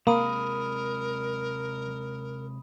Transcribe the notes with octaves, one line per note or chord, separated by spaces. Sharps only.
C3 G#3 A#3 A#4 B5 D#6 D#7